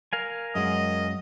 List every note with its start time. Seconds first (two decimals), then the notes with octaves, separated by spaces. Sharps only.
0.13 A#4 F5 G#5
0.55 F#2 G#3 D#5